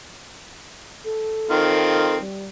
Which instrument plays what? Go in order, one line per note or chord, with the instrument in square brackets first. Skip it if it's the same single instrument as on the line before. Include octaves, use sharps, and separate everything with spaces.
[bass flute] A4
[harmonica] D#3 C4 F4
[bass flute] G3